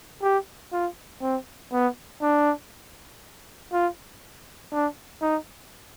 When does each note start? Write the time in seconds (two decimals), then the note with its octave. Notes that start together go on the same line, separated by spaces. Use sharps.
0.23 G4
0.72 F4
1.22 C4
1.72 B3
2.22 D4
3.72 F4
4.72 D4
5.22 D#4